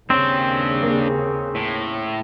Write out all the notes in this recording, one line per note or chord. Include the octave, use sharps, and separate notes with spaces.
D#2 C#3 C4 D4 C#5 G5
A#3
A2